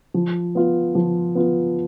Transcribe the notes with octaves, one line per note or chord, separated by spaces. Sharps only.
F3
B3 F4
F3
B3 F4